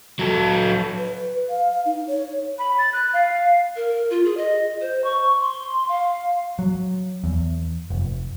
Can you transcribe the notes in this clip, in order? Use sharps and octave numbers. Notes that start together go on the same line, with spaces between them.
F#3 A4
B4
F5
F5
D#4
C#5
B5
A6
F#6
F5
A#4
F4
G#4
D#5
C5
C#6
C6
F5
F#3
E2
F1